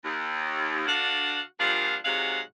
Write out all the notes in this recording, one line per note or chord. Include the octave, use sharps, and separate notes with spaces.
D#2
D3 D4 F#4 F5 F#5
A#2 F3 G3 D4 F5 F#5
G#2 C3 F#3 G#3 F5 F#5